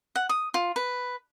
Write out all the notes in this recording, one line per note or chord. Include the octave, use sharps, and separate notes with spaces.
F#5
D#6
F4
B4